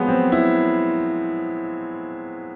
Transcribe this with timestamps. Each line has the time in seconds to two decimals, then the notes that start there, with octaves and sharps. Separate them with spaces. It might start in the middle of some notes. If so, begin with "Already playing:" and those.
Already playing: F3 F#3 G#3 B3
0.08 C4
0.32 E4